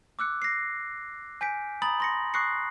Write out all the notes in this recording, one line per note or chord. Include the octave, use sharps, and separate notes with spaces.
D6 E6 F#6 C#7
A#6 C7
G#5 G6 B6 D7
A#5 B5 D#6 A6 F#7
C6 A#6 C#7
C#6 D#6 F#6 A#6 C7 C#7